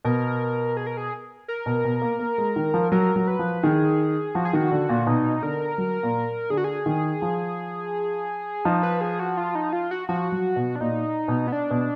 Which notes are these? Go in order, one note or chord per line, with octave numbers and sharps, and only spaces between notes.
B2 A#4
G#4
A#4
G#4
A#4
B2
B2
A#3
A#3
G#3
D#3
F3
F#3 A#4
F#3
B4
F3
D#3 G#4
F3 F#4
G#4
D#3 F#4
D3
A#2
B2 D#4
D3 A#4
F#3
A#2
D3 G#4
F#4
G#4
D#3
F3
F3 D#4
B4
G#4
F#4
F4
D#4
F4
F#4
F3 F#4
F#3
B2
D4
A#2 D#4
B2
B3
D4
B2